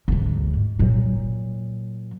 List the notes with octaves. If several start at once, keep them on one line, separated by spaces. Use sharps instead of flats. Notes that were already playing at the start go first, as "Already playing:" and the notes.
D2 G#2
A#2 F#3